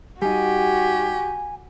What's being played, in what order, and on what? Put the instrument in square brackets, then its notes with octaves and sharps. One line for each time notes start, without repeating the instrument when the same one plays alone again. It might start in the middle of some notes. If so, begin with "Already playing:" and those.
[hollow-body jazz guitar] G3 D#4 [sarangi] F#4 [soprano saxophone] G4 [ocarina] G#5